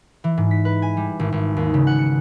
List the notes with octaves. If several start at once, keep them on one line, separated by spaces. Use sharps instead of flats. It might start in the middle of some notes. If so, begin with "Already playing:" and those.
E3
G#2
B6
B4
G#5
G3
G#1
G#1
D#2
C#3
F#5
C#7